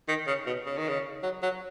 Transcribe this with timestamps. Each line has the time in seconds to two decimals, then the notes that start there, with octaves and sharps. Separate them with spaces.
0.08 D#3
0.27 C#3
0.46 B2
0.66 C#3
0.78 D#3
0.88 C#3
1.23 F#3
1.43 F#3